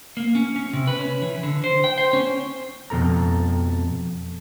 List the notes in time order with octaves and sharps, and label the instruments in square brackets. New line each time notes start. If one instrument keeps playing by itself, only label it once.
[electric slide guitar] A#3
C#4
C#4
C3
B4
C#4
E3
D3
C5
G5
C5
C#4
F2 B2 A4 A#5